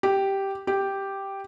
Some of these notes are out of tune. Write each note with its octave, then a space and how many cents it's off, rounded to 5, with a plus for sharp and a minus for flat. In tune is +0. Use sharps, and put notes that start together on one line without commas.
G4 -5
G4 +0